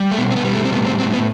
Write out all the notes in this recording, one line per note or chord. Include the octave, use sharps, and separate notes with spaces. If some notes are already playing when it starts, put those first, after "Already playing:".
Already playing: G3
A3
B2 B3
C4
B3
G3
A3
C4
A2 B3
C4
A2 C4
B3